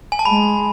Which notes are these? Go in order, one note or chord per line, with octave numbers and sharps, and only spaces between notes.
G#5
A5
G#3 B5